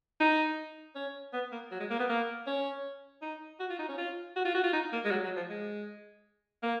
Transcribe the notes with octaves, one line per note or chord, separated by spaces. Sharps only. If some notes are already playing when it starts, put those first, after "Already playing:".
D#4
C#4
B3
A#3
F#3
G#3
A#3
B3
A#3
C#4
D#4
F#4
F4
D#4
C#4
F4
F#4
F4
F#4
F4
D#4
A#3
G#3
F#3
F#3
F3
G#3
A#3